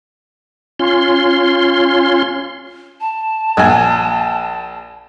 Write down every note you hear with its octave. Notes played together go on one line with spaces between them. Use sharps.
C#4 F4 C6
A5
A#1 G#5